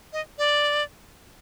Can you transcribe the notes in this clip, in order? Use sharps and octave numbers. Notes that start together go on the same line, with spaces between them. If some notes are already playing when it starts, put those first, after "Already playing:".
D#5
D5